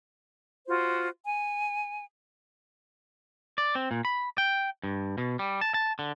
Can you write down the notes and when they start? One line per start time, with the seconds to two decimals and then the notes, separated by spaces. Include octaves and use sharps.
0.67 F4 F#4 C5
1.25 G#5
3.58 D5
3.75 C4
3.91 A#2
4.05 B5
4.38 G5
4.84 G2
5.18 B2
5.39 G3
5.61 A5
5.74 A5
5.99 D3